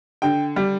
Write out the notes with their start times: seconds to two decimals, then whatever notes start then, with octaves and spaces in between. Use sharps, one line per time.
0.22 D3 G5
0.56 G3